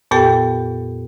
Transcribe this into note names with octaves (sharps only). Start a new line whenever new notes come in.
F2 A#2 B3 G4 A4 G5